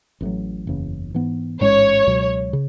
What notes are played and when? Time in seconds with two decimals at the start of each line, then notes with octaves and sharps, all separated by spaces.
0.21 A1 A2 F#3
0.67 F#1 E2 C#3
1.14 G#2 E3 B3
1.60 A1 G#2 G#3 C#4 C#5
2.07 C#2 B2 F#3
2.53 C#3